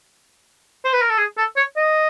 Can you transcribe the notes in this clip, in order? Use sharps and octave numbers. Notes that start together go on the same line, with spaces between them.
C5
B4
A#4
A4
G#4
A4
C#5
D#5